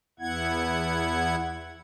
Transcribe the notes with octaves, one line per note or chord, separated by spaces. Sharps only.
E2 B3 E4 F#5 G#6